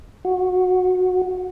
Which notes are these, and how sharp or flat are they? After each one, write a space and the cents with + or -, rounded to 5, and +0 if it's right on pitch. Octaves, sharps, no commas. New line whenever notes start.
F#4 -15